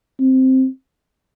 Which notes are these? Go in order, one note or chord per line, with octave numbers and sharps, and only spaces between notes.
C4